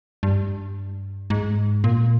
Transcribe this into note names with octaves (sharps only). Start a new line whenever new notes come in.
G2
G#2
A#2